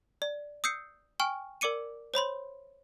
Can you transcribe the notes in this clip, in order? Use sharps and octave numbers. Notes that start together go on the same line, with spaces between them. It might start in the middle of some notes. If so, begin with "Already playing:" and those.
D5
D#6 E6 G6 C7 C#7
G5 G#5 C#6 F6
A#4 D5 D6 C#7 D#7
C5 C#5 B5 C6